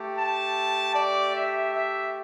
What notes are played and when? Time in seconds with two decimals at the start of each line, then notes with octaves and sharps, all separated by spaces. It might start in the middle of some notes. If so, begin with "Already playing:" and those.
Already playing: A3 G4
0.19 A5
0.95 D5
1.35 E5
1.73 E5